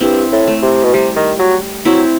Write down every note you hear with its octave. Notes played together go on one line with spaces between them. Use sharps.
G2 C4 E4
A2
A3
C3
B2
C3 G3
D#3
F#3
F#3 C4 E4